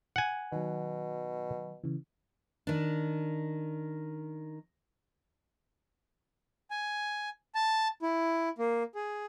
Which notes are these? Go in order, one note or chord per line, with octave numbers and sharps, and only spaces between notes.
F#5 G#5
B2 D#3 F#3
C#3 E3
D#3 D4
G#5
A5
E4
A#3
G#4